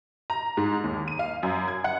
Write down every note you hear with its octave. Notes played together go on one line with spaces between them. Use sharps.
A#5
G#2
D#2
D#7
F5
F#2
G#6
F#5